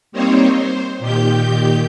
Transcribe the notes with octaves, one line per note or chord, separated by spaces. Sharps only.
G3 A#3 C4 D#4 C5 C#5
C5
A#2 D#3 G4 G6